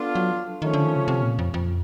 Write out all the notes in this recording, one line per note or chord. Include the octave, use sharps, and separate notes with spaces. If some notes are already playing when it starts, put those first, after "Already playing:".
Already playing: B3 D4 F4 A4
F#3
D#3 F3 A3 C#4
D3
D#3
C#3
C3
A#2
F2
F2